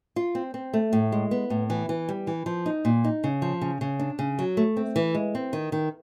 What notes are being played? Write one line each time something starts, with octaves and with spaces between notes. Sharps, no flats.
F4
C4
C4
A3
A2
G#3
B3
A2
E3
E3
G3
E3
F3
D#4
A#2
D#4
C#3
F3
C#3
C#3
D4
C#3
F#3
A3
C4
E3
G#3
C4
D#3
D#3